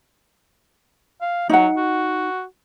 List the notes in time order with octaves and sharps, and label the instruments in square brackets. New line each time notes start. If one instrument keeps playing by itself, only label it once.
[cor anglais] F5
[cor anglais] F#3 [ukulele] D#4 F#5
[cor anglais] F#4